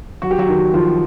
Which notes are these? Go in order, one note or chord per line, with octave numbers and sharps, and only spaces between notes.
F#3 F#4
G4
F#3 F#4
D#3
D#3 F3 F4